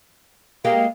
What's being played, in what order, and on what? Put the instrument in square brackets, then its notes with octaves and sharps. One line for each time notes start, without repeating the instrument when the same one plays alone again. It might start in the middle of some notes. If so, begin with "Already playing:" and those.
[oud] G#3 A#3 G4 [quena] F5